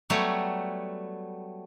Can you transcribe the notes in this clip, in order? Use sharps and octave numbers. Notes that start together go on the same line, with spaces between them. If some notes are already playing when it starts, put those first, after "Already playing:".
F#3 G3 A3 B3 C#5